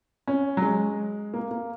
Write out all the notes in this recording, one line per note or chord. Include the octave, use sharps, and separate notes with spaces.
C#4
F#3
G#3
A#3
A#3